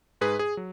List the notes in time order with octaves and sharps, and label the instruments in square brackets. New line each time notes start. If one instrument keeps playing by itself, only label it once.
[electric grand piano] G#2 G#4 B4
G#4
F#3